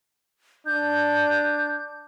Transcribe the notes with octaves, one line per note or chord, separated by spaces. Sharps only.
D4 G6